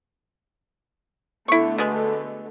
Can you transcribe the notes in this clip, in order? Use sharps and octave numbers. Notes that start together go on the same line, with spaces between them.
D3 A3 B3 E4 C#6
B2 G#3